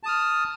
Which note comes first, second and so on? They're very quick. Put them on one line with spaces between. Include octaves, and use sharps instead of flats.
A5 D#6 F6